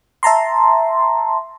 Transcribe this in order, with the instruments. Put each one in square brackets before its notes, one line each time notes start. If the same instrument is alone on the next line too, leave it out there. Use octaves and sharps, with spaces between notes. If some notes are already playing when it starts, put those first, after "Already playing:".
[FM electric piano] E5 A5 A#5 C6